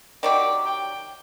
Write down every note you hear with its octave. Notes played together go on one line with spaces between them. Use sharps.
D#3 F#3 G4 D5
G5